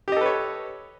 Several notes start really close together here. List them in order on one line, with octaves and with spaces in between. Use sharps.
G4 D#5 A4 B4 C#5